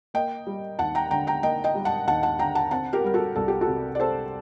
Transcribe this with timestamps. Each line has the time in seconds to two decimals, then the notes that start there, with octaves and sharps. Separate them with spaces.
0.14 A#3 D#5 G5
0.47 G3
0.79 D#2 F#5 A5
0.95 G5 A#5
1.11 D3 G5 A#5
1.27 G5 A#5
1.43 A#3 D#5 G5
1.64 D#5 G5
1.75 G3
1.85 F#5 A5
2.07 D#2 F#5 A5
2.23 F#5 A5
2.39 D3 G5 A#5
2.55 F#5 A5
2.71 C4 F#5 A5
2.93 G4 A#4
3.04 G3 A#4
3.14 F#4 A4
3.35 C2 A4
3.48 G4
3.61 F#4 A4
3.68 C3
3.95 D5
3.99 C4 A4 C5